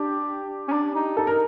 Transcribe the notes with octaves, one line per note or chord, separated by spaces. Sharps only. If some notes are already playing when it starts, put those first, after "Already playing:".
Already playing: D4 G4
C#4
D4
D#4
D#4 A4
D#4 A#4